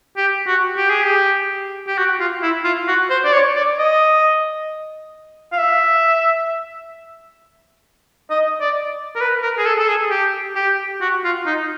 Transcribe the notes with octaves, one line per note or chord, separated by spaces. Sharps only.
G4
F#4
G4
G#4
G4
G4
F#4
F4
E4
F4
F#4
C5
D5
C#5
D5
D#5
F5
E5
D#5
D5
A#4
B4
A#4
G#4
A4
A4
G#4
G4
G4
F#4
F4
D#4